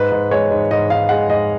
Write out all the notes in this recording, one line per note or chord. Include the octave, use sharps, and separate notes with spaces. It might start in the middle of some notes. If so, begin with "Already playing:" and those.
Already playing: G#2 B4
G#2
G#3 C#5
G#2
G#2 D#5
G#2 F5
G#3 F#5
G#2 D#5